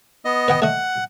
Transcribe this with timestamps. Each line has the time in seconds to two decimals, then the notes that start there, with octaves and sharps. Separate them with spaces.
0.25 B3 D#5
0.48 B4 F#5 G5
0.62 A3 D#5 F#5